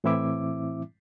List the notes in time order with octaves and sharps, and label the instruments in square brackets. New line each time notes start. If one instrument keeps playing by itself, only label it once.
[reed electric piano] A2 E3 C4 E4 E5 D6